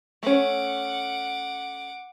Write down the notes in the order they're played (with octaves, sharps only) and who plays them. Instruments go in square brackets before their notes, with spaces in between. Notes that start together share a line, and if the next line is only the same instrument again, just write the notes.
[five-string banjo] A3 C#4 [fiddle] F#5 D6